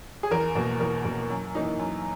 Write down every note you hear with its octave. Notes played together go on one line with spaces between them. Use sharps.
G#4
E2 A#4
B2 A#3
E2 A#4
B2 A#3
F#2
E3 A#3 D#4
F#2